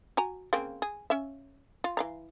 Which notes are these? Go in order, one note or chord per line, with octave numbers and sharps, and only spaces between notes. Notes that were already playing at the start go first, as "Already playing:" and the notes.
F#4 G#5 A#5
C#3 A#3 C4
G#4
C#4 E5
F4
E3 F5 A#5